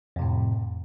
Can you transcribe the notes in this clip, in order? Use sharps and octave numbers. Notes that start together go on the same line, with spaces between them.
F2 A2 C3